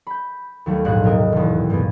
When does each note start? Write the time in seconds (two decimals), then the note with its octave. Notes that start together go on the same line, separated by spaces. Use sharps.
0.07 B5 G6
0.66 D#2 F#3 G3 A3
0.85 A#1 G#2 G3 F#6
1.04 B1 C3 A#4 D#5
1.32 D#1 E2
1.70 G2 A#2 A#3 B3